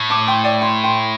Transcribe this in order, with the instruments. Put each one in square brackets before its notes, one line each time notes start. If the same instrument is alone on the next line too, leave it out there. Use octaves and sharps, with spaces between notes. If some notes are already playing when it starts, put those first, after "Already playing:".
Already playing: [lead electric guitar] A2
[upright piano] A5 D6
G5 C6
D5 G5
G5 C6
G5 C6